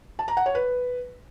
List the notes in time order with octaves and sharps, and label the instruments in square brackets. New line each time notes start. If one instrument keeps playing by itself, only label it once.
[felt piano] A5
A#5
F#5
C#5
B4